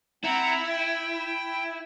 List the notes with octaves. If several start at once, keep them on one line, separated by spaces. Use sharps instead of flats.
C4 E4 F#5 A#5
G5